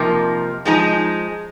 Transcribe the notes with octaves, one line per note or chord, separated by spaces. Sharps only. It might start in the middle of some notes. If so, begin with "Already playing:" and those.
Already playing: C3 F3 A#3 D#4
F3 G#3 D#4